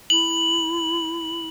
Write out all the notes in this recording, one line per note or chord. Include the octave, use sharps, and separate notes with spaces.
E4 F#7